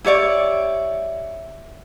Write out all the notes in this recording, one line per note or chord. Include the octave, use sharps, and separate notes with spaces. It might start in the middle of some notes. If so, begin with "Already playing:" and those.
E4 G4 C#5 D5